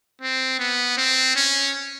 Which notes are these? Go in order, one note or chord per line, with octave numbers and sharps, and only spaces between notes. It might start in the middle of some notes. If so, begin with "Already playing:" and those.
C4
B3
C4
C#4